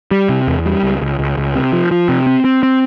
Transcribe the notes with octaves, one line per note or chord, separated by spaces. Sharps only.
G3
C3
E2
G3
C#2
C#2
C#2
C#2
C3
F3
F3
C3
C4
C4
C4